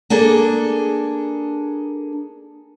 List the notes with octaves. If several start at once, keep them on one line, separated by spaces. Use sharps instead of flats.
A#3 D4 G#4 A4